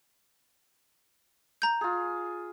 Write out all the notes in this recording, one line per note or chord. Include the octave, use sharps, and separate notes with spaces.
A#5 G6
F4 G#4